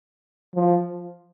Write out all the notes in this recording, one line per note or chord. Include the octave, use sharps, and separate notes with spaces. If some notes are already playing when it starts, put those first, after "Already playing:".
F3